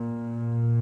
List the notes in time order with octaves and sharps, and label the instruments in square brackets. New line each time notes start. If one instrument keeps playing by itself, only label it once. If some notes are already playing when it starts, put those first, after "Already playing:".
Already playing: [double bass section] A#2